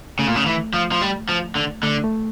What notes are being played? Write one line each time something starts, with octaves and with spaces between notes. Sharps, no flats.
C#3 A3
A#2
C#3
E3
F3
F3
G3
F3
D3
D3 A3
A3